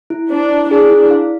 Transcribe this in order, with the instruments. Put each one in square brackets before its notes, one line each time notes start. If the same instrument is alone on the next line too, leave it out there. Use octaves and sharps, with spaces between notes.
[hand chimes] E4
[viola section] D4 [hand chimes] C5
[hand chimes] E4
[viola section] D4 [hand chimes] G#4
[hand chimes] E4
F5